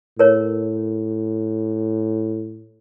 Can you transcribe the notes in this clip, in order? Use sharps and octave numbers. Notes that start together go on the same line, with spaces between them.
A2 A#4 C#5